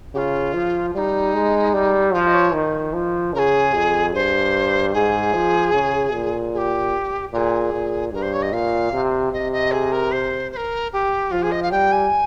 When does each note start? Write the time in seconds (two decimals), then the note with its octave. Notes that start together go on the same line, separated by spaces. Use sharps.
0.14 C#3 F4 G4
0.54 F3
0.94 G3 D#4 F4
1.34 G#3
1.74 G3
2.14 F3 F4
2.27 D#5
2.34 C#5
2.54 D#3
2.94 F3
3.34 C#3 A#4
3.39 G#4
3.74 F2
4.14 G2 C5
4.93 G#2 G#4
5.34 F3
5.74 C#3
6.13 A#2
6.53 G#4
6.57 G4
7.33 A#2 A#4
7.37 G#4
7.73 A#2
8.13 G2 A#4
8.22 C5
8.33 C#5
8.42 D#5
8.52 A#2 F5
8.93 C3
9.32 C3 D#5
9.52 D#5
9.72 G#4
9.92 A#4
10.12 C5
10.52 C5
10.56 A#4
10.93 G4
11.31 F3 F4
11.42 G#4
11.51 D#5
11.62 F5
11.71 G3 G5
11.92 G#5